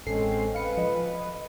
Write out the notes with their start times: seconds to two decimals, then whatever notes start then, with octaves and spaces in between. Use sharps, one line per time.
0.07 A1 G#3 C4 C#4 A4 C7
0.55 B4 F5 C#7
0.77 F3 D#5
1.15 D#5